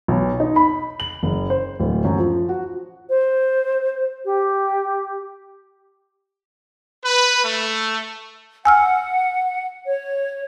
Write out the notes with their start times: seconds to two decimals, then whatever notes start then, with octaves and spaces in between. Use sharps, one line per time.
0.08 B1
0.40 D#4
0.56 B5
1.00 F#7
1.23 F#1
1.50 C5
1.79 D1
2.05 F#2
2.19 F3
2.49 F#4
3.09 C5
4.25 G4
7.05 B4
7.43 A3
8.65 F#5 G#5 E6 F6
9.85 C#5